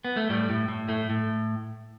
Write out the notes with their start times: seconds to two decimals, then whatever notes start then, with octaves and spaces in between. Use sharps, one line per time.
0.05 B3
0.17 A3
0.29 A2 G3
0.50 A2
0.69 A2
0.89 A2 A3
1.10 A2